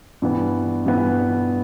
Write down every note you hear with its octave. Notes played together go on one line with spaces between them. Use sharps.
G2 E3 B3
G2 E3 B3